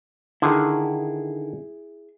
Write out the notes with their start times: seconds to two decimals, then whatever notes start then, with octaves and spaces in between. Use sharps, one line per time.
0.42 D3 D#3 E4 G#4